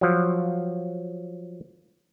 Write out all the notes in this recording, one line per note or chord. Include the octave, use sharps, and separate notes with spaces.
F3 F#3